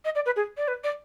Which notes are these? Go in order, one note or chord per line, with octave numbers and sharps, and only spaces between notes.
D#5
D5
B4
G#4
D5
B4
D5